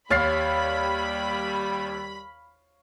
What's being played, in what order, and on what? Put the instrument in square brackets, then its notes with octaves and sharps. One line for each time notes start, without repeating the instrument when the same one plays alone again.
[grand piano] D#2 A6 C7 [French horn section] G3 [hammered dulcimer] C#5 F5 [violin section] B5